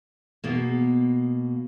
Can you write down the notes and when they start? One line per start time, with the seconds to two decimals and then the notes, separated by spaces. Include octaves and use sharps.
0.44 B2 A#3